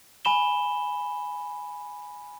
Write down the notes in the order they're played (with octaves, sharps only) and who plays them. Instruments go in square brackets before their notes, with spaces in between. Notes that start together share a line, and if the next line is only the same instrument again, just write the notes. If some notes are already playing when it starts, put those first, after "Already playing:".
[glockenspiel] G#5 B5 E7 G7